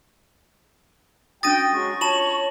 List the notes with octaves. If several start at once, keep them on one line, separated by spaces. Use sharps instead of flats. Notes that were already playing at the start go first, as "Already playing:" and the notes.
C#4 D4 F#4 G5 D#6 A6 A#6 D#7
F#3 G#3 C#6
F4 C#5 A5 E7 F#7